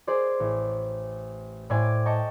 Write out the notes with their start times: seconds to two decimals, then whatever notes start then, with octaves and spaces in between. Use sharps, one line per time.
0.07 G#4 C5 D5
0.40 A1
1.70 A2 C5 D5 G#5 D6
2.06 D#5 G5 A5 A#5 C#6